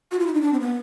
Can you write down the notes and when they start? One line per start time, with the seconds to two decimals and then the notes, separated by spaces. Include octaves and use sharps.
0.11 F#4
0.19 F4
0.27 E4
0.34 D#4
0.41 D4
0.53 C4
0.60 B3